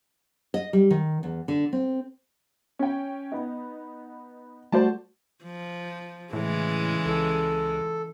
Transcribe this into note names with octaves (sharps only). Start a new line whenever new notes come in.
D#5
G3
D#3
E2
D3
C4
C#4 G5
B3 D#4
G3 A3 F#4 C5 D5 A5
F3
A2 C#3 E3 G#3
C#2 A4